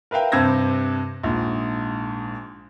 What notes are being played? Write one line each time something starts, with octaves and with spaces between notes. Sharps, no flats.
A#4 B4 E5 F5 G5
G2 C3 C5 E6 G#6 A#6
A#1 G#2